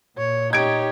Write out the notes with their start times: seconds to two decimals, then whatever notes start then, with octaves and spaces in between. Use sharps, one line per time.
0.18 A#2 C#5
0.53 D#4 G4 C#5 G#6 D7